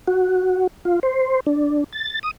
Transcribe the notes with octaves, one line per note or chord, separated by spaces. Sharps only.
F#4
F4
C5
D4
A6
D#6